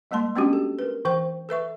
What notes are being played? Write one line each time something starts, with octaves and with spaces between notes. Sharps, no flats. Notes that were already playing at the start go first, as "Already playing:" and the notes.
G3 G#3 A#3 A5 C6
G#3 B3 C#4 D4 F#4 G4
A4
A#4 B4
E3 C5 G5 C#6
A4 B4 E5 C#6